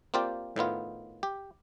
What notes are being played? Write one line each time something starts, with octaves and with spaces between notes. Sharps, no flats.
A#3 C4 F4 G4 D5 G5
A2 D#3 B3 F4
G4